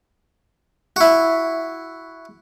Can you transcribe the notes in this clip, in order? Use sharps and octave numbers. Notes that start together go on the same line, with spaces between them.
E4 F#4